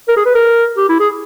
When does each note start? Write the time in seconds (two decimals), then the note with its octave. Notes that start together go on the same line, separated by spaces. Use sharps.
0.08 A#4
0.17 G#4
0.25 B4
0.34 A#4
0.77 G4
0.89 E4
1.00 G#4